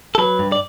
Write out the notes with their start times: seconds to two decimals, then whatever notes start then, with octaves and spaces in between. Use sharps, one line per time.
0.15 A4
0.18 F#3 B4
0.39 G2
0.52 D5